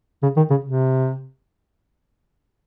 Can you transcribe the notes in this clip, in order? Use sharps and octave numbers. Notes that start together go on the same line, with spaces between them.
C#3
D#3
C#3
C3